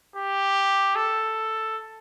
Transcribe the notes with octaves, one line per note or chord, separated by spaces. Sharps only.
G4
A4